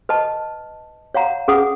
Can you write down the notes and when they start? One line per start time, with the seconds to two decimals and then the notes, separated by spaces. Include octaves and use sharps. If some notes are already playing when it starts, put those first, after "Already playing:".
0.09 B4 D#5 A5
1.15 C#5 F5 F#5 A#5
1.48 C#4 G#4 B4 F#5 D#6